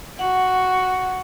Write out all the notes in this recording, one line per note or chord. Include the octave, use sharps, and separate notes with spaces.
F#4 F#5